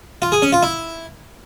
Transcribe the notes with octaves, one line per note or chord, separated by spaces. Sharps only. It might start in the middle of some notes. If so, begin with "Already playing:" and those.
F4
G#4
C#4
F4
E4